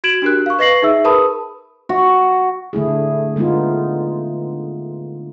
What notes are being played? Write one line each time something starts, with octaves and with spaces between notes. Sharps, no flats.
F#4 G#6 D7 E7 F#7
D4 F#4 G4 A#4 F#6
F5 C#6
B4 D#5 C#6 A#6 C7 F#7
D#4 G#4 E5 E6
G#4 A#4 B4 A5 B5 D#6
F#4
D3 A3 E4 G#4
D3 G#3 B3 D#4 F4